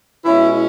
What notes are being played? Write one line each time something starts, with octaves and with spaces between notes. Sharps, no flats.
B2 G#3 C#4 E4